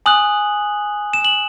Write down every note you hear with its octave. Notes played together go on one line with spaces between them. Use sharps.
G#5 D#6 F#6 F#7
E7
F#7